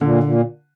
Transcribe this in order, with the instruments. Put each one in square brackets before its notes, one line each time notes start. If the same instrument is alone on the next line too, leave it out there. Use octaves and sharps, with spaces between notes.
[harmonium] A#2 [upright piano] D3
[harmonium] A#2